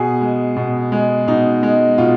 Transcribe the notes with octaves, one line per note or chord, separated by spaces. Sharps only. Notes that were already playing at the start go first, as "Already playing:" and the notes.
Already playing: B2 G#4
G#3
B2
G#3
B2 D#4
G#3
B2 F4